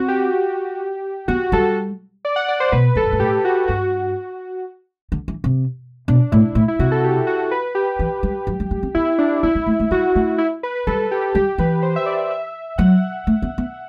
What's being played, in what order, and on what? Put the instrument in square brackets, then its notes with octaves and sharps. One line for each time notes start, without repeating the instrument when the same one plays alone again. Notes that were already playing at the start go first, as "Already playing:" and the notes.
Already playing: [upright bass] C4 [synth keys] F#4
[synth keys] G4
[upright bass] B3 [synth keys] F#4
[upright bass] G3 [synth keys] A4
[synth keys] D5
F#5
D5
C5
[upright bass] B2 [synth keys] B4
[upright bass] E2 [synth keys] A4
[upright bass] F#2
G2
[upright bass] A2 [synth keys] G4
[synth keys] F#4
[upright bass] G2 [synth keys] F#4
[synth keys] F#4
[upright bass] D3
E3
C3
[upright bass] B2 [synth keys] D4
[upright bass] A2 [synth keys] E4
[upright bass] A2 [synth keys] E4
[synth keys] E4
[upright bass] C3 [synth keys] F#4
[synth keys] A4
G4
F#4
B4
G4
[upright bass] E3
G3
F#3
G3
G3
C4
[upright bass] B3 [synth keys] E4
[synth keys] D4
[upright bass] B3 [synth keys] E4
[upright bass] B3
A3
A3
[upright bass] G3 [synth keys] F#4
[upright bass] A3
[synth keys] E4
B4
B4
[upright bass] G3 [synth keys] A4
[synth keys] G4
[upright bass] G3 [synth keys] G4
[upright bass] E3 [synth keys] B4
[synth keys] C5
E5
D5
E5
[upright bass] F#3 [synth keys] F#5
[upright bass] A3
B3
B3